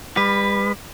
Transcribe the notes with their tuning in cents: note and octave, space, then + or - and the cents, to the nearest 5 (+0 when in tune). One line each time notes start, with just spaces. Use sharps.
G3 +35 B4 +0